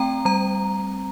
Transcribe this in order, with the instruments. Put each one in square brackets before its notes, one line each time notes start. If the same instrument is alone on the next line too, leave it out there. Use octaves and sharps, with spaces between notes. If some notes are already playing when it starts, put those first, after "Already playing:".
Already playing: [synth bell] A3 C4 G5 A#5
G3 A#5